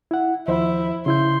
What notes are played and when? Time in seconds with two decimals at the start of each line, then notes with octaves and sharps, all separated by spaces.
0.11 E4 F#5
0.48 D#2 F3 E4 C5
1.06 C#3 E4 C6 G6